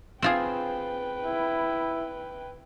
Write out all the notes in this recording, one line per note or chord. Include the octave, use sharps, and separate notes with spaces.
C4 F4 G#4 B4 G5
E4